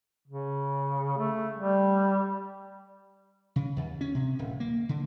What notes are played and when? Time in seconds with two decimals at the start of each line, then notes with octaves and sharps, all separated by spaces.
0.28 C#3
1.18 A3
1.55 G3
3.56 C#3
3.76 D#2
4.01 C#4
4.15 C3
4.39 D1
4.60 A#3
4.89 D3